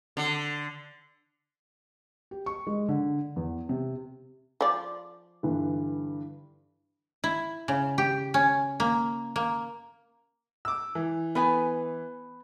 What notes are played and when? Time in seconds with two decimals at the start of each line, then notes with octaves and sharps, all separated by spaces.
0.17 D3
2.31 G4
2.46 C#6
2.67 G#3
2.88 D3
3.36 E2
3.69 C3
4.61 F3 D5
5.43 G2 D3 E3
7.24 E4
7.68 C#3
7.98 G4
8.34 C#4
8.80 A#3
9.36 A#3
10.65 D6 E6
10.95 E3
11.35 B3 B4 G#5